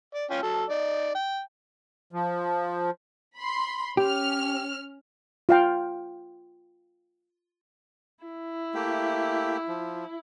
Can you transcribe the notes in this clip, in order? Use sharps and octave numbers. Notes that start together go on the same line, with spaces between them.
D5
C#4 F4 G5
F#3 A4
D#4 D5
G5
F3
B5 C6
C#4 G4 F6
F4 F5 G5
E4
A3 A#3 G4
F3